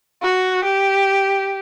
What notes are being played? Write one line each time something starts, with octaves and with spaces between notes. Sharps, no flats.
F#4
G4